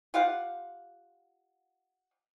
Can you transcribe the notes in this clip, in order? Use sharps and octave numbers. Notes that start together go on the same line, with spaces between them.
F4 G4 F5 F#5